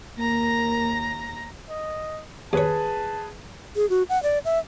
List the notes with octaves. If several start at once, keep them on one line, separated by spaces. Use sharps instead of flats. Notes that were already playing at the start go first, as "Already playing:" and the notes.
D#2 A#3 A#5 A#6
D#5
D#2 G#4 B4 C#5 A5
G#4
F#4
F#5
D5
E5